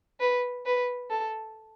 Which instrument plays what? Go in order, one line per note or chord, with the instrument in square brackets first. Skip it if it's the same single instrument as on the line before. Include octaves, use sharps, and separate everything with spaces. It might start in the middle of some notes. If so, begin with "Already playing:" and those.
[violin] B4
B4
A4